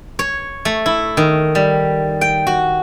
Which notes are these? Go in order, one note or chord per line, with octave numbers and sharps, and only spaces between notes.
C#5
A3
E4
D#3
G3
G5
F#4